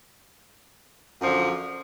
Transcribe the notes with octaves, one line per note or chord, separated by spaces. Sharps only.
F#2 D3 F3